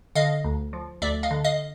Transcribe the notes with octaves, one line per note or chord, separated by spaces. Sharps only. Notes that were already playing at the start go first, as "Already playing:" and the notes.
D3 D#5 F5
D2
F3
D2 D5 E5
D#5 F5
D3
D#5 F5